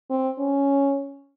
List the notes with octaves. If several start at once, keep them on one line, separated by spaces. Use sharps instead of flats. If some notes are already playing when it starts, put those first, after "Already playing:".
C4
C#4